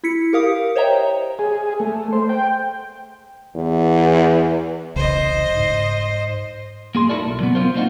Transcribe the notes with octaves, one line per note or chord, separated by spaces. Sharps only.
E4 B6 C#7
G4 A#4 F5 D#6
C5 C#5 D#5 E5 G5 A#5
G#4
A3
C5
G5
E2
E1 C2 C#3 C5 D#5
G#2
A#3 G#4 C6
D#4 E4 F#4 A4 A#4 D5
B1
F#3 B3
B3 C4 F4 A#4 C5
A#3 C4 D4 D#4 F4 F#4